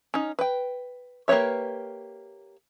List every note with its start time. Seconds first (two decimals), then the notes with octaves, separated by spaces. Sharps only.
0.14 C#4 D#4
0.39 B4 G5
1.28 A#3 G4 B4 C#5 E5